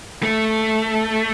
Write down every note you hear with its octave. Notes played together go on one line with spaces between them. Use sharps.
A3